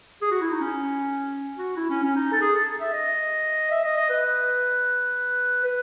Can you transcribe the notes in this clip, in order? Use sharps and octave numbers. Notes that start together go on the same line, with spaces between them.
G#4
F#4
E4
D#4
C#4
F#4
E4
C#4
C#4
D#4
A4
G#4
A4
E5
D#5
E5
D#5
D#5
B4
B4